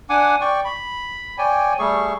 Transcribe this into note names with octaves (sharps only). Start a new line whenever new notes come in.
D4 F#5 G#5 D6
D5 G5 C#6
B5
C#5 D5 G5 G#5
G3 A3 G#4 C#6